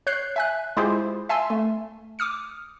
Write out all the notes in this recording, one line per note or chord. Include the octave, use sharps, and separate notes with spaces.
C#5 F#6 G6 C7
E5 G#5 F#6
G#3 E4 F4 G4 G#4 C5
E5 F5 G#5 A5 C6 E6
A3
D6 D#6 F6 C#7